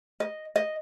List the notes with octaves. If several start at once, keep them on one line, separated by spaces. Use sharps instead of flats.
D#5
D#5